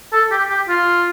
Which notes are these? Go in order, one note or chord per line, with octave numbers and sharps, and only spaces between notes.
A4
G4
G4
F4